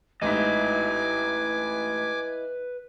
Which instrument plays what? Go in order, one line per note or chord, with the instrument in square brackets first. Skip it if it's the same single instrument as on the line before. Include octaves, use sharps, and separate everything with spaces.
[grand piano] A1 G#2 B6 [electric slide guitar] E4 D#5 [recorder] B4 [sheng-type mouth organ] G#5 D6